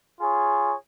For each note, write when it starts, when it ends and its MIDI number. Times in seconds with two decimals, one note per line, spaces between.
0.21 0.74 65
0.21 0.74 68
0.21 0.74 73